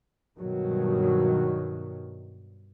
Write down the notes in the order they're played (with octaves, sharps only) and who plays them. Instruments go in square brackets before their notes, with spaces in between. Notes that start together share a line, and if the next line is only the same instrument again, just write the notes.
[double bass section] G2 B2 D#3 F#3